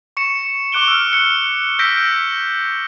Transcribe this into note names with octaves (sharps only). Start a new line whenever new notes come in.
C#6 C#7 E7
C#6 D6 F#6 D7 G7
E6 F6
F#6 C#7
E6 G6 A#6 B6 D7